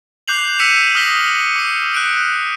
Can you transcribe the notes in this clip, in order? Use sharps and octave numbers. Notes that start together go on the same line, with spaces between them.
D6 F#6 G6 C7 F7 F#7
E6 B6 C#7 D#7 E7
D#6 F6 A#6 B6 G7
D6 C#7
F6 F#6 C#7 D7